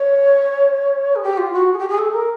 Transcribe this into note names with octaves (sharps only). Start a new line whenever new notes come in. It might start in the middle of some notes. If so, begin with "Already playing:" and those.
Already playing: C#5
G#4
G4
F4
F#4
G#4
G4
G#4
A4
A#4